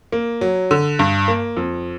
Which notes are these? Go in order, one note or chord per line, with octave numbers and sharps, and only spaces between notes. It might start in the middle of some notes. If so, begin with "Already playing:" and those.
A#3
F#3
D3
G2
A#3
F2